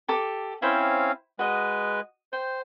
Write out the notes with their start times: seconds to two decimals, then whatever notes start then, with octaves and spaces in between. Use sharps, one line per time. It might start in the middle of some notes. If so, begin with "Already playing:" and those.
0.08 G4 A4 D6
0.62 C4 C#4 E4 C5 F5 G5
1.39 G#3 F#4 B4 D#5
2.33 C5 G5